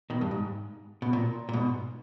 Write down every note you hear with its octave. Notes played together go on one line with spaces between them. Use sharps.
B2 D#3
G2
G#2
B2
A#2
A#2
G#2 B2